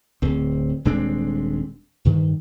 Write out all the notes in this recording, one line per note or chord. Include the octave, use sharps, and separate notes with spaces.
D1 C4
D#1 G#3 C4 D4
G2 D#3